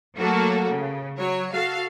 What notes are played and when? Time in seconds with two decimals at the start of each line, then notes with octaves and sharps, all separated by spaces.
0.17 F#3 A3 A#3 F#4 A4
0.69 C#3
1.18 F#3 C#5
1.53 F#4 A4 F5